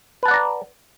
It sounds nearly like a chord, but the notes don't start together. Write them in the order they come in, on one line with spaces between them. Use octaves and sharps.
B4 A5 F#5 D5 A#5